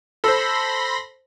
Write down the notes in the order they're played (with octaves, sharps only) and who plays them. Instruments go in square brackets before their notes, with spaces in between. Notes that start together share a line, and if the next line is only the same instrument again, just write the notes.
[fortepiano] A4 C5 [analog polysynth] B5 C6 A#6